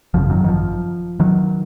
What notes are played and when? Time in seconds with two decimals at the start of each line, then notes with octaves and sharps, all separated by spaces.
0.14 G#1 F#2 C#3 F3
0.31 D#3 F#3
0.44 D#3
0.48 F3
1.20 D#3 F#3